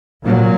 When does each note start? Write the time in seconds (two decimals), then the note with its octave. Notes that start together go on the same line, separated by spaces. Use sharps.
0.25 A#2 F#3